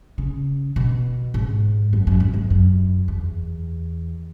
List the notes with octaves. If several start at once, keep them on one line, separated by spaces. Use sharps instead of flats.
C#3
B2
G#2
F#2
F#2
G#2
F#2
F#2
E2